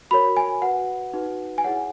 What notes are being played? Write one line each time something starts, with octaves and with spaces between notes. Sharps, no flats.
F#4 A#4 C#5 B5
G#5
F#4 B4 F#5
D#4 F#4 B4
G#5
E4 G#4 C#5 F#5